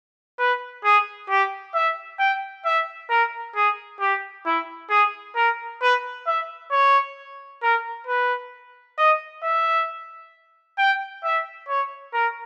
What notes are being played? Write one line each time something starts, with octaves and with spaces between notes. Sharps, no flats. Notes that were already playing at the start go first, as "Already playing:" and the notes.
B4
G#4
G4
E5
G5
E5
A#4
G#4
G4
E4
G#4
A#4
B4
E5
C#5
A#4
B4
D#5
E5
G5
E5
C#5
A#4